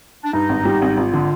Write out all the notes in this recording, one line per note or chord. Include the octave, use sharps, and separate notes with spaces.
D4
G2 D#4
G#1
G3
G#1
G#1 F4
D3